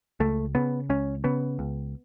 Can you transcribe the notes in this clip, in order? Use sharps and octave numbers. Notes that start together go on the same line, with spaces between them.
C#2 A3
C#3 B3
C#2 C#4
C#3 B3
C#2